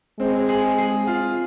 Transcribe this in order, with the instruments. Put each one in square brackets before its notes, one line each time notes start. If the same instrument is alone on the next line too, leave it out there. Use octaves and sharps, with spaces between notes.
[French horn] G#3 [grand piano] C4
[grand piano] G#4
G#4
F4